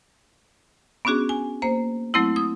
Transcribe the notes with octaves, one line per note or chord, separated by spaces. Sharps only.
B3 C#4 D4 F#4 G#4
G#5
A#3 C5
F#3 A3 C4 E4
D#6